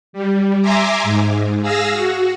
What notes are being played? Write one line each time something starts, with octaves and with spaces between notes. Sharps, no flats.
G3
E5 G#5 A#5 C6 D6
G#2
G#4 F5 E6 A#6
F#4